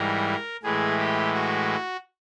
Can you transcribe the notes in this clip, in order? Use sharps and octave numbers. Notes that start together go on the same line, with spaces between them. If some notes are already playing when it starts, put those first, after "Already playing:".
Already playing: G#2 E3 G3 A#4
A2 E3 G#3 G#4
G4
F#4